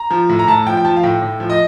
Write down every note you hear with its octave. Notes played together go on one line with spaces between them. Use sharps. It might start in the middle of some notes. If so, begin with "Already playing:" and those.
Already playing: A#5
F3
A2
A#5
A2 A5
F3 G5
G5
F3 A5
F5
A2 G5
A2
F3
D#5